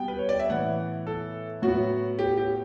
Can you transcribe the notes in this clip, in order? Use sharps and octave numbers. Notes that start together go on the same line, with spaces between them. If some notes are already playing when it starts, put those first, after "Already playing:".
Already playing: B2 G3 B3 G5
B4
C#5
D5
E5
A2 E3 B3 F#5
A4
A2 F#3 B3 F#4
G4
G4